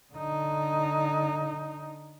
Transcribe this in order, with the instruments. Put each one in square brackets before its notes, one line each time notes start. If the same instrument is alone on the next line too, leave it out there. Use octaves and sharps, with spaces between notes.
[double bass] D3 D#4